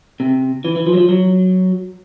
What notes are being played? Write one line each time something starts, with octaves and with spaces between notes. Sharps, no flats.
C3
E3
E3
F3
F#3
F3
F#3